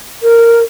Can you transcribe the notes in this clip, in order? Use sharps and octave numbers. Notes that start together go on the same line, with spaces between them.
A#4